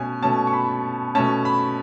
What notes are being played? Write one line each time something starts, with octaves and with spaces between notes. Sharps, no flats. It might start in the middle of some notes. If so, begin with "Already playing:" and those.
Already playing: B2 A3 C#4 G#5
B2 A3 C#4 A5
C#6
B5
B2 A3 C#4 A5
B5